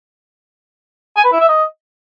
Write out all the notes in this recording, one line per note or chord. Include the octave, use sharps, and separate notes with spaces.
G#5
B4
E4
E5
D#5